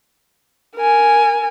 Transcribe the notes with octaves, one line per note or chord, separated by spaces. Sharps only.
A#4 G#5